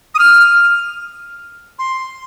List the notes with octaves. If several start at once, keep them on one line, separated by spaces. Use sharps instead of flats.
D#6
F6
C6